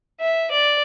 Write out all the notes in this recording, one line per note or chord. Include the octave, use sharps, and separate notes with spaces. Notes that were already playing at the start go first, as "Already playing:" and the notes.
E5
D5